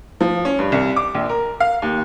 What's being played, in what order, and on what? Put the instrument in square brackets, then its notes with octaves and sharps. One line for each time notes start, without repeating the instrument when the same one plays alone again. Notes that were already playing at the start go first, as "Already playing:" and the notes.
[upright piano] F3
C#4
G2
C2
D6
A#1
A#4
F5
D#2